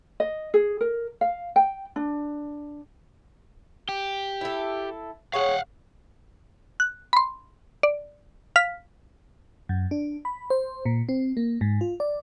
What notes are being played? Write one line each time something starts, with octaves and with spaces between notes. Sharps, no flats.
D#5
G#4
A#4
F5
G5
D4
G4
E4 A4
G#3 C#5 F5 F#5
F#6
B5 C6
D5
F5 F6 B6
F#2
D4
B5
C5
A#2
C4
A#3
G#2
F4
D5